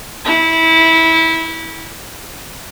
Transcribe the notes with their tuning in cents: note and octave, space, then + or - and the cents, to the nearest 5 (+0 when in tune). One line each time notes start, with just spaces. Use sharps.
E4 -20